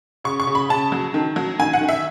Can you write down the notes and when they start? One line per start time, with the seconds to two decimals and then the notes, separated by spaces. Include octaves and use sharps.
0.24 C#3 C#6
0.40 C#6
0.47 C#3
0.55 B5
0.69 C#3 A5
0.92 F#3
1.14 D#3
1.36 F#3
1.59 D#3 G#5
1.73 F#5
1.81 D#3
1.89 E5